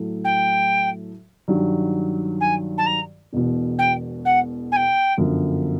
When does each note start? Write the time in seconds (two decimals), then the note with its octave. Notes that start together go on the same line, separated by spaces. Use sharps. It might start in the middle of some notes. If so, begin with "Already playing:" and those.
Already playing: A2 F#3 A3
0.25 G5
1.48 G2 D#3 F#3
2.41 G#5
2.78 A5
2.87 A#5
3.33 E1 E2 B2
3.79 G5
4.25 F#5
4.72 G#5
4.76 G5
5.17 G1 F#2 D3 F3